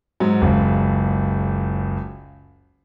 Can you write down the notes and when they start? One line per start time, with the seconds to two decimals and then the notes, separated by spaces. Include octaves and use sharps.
0.20 G#2 F#3
0.41 F#1 C#2